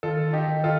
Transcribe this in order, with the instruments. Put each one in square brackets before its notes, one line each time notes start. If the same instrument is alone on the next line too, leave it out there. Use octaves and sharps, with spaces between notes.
[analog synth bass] D#3 [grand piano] F4 A4
[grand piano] D#4 G4
[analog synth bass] D#3
[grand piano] F4 A4